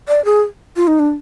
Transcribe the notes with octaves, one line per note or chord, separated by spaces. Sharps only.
D5
G#4
F4
D#4
D4